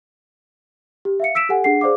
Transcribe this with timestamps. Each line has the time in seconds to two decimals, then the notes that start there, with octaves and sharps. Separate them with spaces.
1.05 G4
1.20 E5 F5 C#7
1.35 E6 B6 D7 E7
1.49 G4 A4 F#5 G#5
1.64 D4 G#4 F#5 C7
1.81 G#4 C5 D5 F5 D6